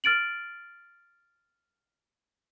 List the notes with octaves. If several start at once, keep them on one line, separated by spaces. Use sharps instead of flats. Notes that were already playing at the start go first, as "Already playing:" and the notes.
F6 A6 D7 F#7